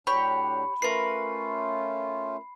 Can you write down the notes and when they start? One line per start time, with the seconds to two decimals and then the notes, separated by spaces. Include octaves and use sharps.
0.07 A2 F#3 D4 G4 C#5 B5
0.82 A3 C#4 F4 A#4 B4 C7